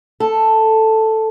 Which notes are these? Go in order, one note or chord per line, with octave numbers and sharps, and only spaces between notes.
A4